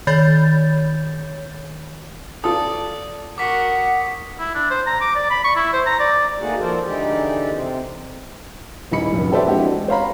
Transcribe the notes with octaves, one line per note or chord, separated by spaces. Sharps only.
D#3 C#5 B5 G6 A6
F4 A4 D5 D#6
F#4 A#4 F#5 D6 B6
E4
D4
C5
A#5
D6
D5
B5
C#6
E4
C5
A#5
D5
A3 A#3 D#4 F#4 G#4 F#5
F3 A4 A#4 C5 D5
D3 E3 G#3 D#4 G4 D5
C3 C4
D#1 E3 D#4 B5 C#7
F1 A#1 F#2
G4 A4 B4 C5 D5 E5
E3 G#3 C4 D4 F#4 G4
G#3
C5 C#5 F5 A#5 B5